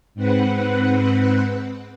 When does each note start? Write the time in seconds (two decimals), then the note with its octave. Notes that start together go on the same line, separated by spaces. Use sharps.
0.14 G#2 C4 B4 F#5